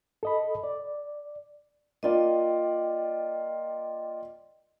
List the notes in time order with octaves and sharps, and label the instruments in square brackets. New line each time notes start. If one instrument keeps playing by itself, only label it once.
[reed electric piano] A4 D#5 B5
D5
[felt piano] A#3 F4 D5 [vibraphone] D#5 G5